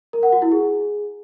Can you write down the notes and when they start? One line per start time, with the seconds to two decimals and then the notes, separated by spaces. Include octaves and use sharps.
0.13 A#4
0.23 F#5
0.32 F#4
0.42 E4
0.52 G#4